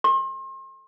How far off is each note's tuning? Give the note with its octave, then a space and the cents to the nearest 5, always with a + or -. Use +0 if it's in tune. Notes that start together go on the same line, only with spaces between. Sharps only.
C6 +40